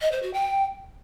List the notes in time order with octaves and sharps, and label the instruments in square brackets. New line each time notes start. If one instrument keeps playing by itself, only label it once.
[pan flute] D#5
C5
F#4
G5